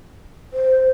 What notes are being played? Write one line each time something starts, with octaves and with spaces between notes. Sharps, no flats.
C5